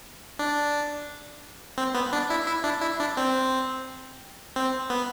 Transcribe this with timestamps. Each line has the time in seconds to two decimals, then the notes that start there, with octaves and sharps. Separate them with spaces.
0.39 D4
1.78 C4
1.94 B3
2.13 D4
2.30 E4
2.47 E4
2.64 D4
2.81 E4
3.00 D4
3.17 C4
4.56 C4
4.90 B3